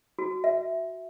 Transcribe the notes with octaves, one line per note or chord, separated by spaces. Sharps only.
F#4
E5